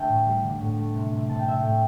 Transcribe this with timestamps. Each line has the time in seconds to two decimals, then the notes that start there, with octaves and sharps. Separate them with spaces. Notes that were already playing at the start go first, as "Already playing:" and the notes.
Already playing: D3 A3 E5 G5 A5
0.09 A2
0.26 G3
0.44 D3
0.60 A2
0.77 A3
0.95 C3
1.12 C3
1.29 C3 A5
1.39 G5
1.46 C3 E5
1.58 A2 G5